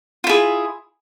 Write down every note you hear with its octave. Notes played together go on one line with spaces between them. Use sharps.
E4 F4 G#4